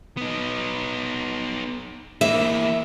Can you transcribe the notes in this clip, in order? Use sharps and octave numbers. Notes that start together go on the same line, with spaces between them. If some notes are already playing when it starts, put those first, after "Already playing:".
B3 D#4
E3 A#3 E5